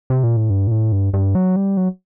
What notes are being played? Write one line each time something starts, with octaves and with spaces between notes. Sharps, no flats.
C3
A#2
A2
G2
A#2
A2
G2
G2
F#3
G3
F#3